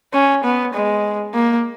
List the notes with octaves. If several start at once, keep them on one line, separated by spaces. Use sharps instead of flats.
C#4
B3
G#3
A#3